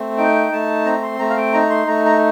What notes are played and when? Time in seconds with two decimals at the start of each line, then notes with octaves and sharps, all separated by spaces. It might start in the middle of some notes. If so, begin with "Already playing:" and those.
Already playing: A3 C4
0.18 D#4 G5
0.52 A3 A5
0.85 C4 A#5
1.02 C6
1.19 A3 A#5
1.30 F5
1.37 G5
1.53 D#4 A#5
1.70 C6
1.87 A3 A#5
2.05 A#5